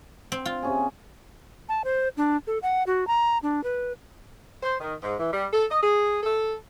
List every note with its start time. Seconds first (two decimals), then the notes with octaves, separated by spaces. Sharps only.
0.32 C4
0.46 F4
0.62 C3 C#4 G#4
1.69 A5
1.84 C5
2.17 D4
2.47 A4
2.63 F#5
2.87 F#4
3.07 A#5
3.43 D4
3.64 B4
4.62 C5
4.79 D#3
5.02 G#2
5.18 E3
5.32 G3
5.52 A4
5.69 D#5
5.82 G#4
6.23 A4